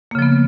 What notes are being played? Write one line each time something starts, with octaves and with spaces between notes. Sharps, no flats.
C#3 F3 A#3 B3